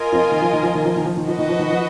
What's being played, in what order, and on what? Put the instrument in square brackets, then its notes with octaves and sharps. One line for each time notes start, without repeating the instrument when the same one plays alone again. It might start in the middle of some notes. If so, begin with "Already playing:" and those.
Already playing: [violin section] F4 A#4 D#5 G#5
[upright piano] F2 F3
D#3
F3
D#3
F3
D#3
F3
D#3
F3
D#3
[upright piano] F3 [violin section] F#4 B4 D#5
[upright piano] D#3
F3
D#3
F3